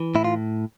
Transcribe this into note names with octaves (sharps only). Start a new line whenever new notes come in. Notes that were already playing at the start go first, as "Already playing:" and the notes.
Already playing: E3
A2 E4
F4